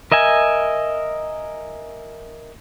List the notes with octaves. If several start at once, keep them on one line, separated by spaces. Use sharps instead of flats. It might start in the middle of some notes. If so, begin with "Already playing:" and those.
A#4 D#5 E5 G#5